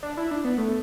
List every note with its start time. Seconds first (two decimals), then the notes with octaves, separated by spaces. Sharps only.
0.03 D4
0.17 E4
0.31 D4
0.44 B3
0.58 A3